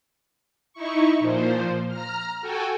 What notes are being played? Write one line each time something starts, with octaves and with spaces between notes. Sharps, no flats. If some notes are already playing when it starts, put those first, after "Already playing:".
D#4 E4 C#6
A#2 F3 C5
A#5 F6
F#4 A4 G5 G#5